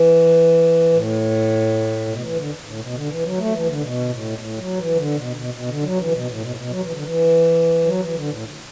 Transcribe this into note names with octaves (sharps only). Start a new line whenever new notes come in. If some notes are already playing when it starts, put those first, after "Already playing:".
Already playing: E3
A2
B2
E3
D3
A2
B2
D3
E3
F#3
A3
F#3
E3
D3
B2
A2
A2
F#3
E3
D3
B2
B2
B2
D3
F#3
E3
B2
A2
B2
A2
B2
F#3
E3
D3
E3
F#3
E3
D3
A2